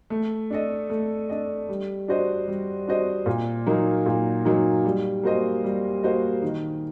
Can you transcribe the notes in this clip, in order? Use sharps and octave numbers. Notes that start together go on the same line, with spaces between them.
A3
D4 A4 D#5
A3
D4 A4 D#5
G3
D4 F#4 C5 D#5
G3
D4 F#4 C5 D#5
A#2
F#3 A#3 D#4
A#2
F#3 A#3 D#4
G3
A#3 F#4 C5 D#5
G3
A#3 F#4 C5 D#5
D#3